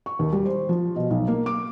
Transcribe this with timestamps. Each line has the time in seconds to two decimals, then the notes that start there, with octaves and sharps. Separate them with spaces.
0.06 C#6
0.19 D#2
0.33 G3
0.46 C5
0.69 F3
0.96 B2
1.10 B1
1.28 A#3
1.46 D6